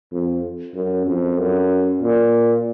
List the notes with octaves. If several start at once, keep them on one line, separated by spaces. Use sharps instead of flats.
F2
F#2
F2
F#2
A#2